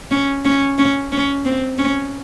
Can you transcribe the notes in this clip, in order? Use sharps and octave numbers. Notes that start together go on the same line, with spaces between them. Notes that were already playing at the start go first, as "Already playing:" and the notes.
C#4
C#4
C#4
C#4
C4
C#4